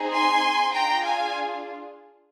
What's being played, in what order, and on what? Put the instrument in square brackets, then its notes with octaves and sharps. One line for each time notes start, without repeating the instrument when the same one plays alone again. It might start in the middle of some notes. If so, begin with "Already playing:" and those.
Already playing: [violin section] C4 D#4 G#4
G#5 C6
D4 F4 G#4 G5 A#5
F5 G#5